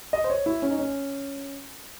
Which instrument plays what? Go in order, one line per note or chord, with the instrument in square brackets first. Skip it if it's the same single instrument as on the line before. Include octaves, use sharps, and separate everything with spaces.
[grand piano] D#5
C5
C#5
E4
C#4
D#4
C#4